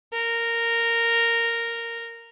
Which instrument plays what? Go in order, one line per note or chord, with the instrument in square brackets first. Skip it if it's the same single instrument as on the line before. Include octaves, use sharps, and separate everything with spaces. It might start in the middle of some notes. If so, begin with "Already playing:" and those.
[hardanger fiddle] A#4